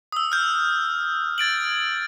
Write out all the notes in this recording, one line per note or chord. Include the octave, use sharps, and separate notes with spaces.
D#6 E6
F6 G6
G#6 A6 D7 F#7